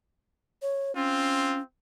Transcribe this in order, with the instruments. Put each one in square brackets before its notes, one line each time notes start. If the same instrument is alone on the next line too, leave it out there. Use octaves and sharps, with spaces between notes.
[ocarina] C#5
[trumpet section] C4 F4 [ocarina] C#4